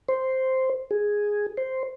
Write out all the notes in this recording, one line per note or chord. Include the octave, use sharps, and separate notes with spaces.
C5
G#4
C5